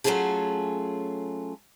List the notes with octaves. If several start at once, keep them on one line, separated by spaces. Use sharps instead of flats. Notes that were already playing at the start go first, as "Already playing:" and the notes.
F#3 A3 C#4 F4 G#4 A4